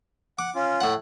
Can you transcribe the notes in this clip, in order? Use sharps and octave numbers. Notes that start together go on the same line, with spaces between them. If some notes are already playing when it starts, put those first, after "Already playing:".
F#5 D6
C#4 F4
A2 F#5